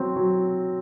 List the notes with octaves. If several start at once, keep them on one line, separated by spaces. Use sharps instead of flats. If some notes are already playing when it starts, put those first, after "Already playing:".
Already playing: F#3 C4
F#3